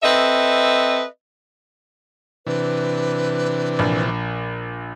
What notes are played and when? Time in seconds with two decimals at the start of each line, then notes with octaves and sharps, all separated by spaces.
0.03 C4 A4 B4 D#5 E5
2.47 C3 E3 D4 B4
3.79 A#1